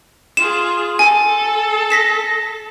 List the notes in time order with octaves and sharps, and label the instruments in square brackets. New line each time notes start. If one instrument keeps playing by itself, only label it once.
[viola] F4 G#4 [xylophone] E7
[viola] A4 A5 [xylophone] G#5
[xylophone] A#6 B6 E7